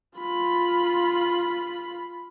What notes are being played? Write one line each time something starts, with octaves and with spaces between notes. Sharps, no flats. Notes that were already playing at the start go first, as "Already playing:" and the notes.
F4 B5